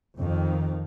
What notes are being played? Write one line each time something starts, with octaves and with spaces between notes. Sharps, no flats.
F2 D#3